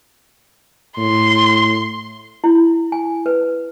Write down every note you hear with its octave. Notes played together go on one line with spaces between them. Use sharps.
A2 C6
E4
G#5
B4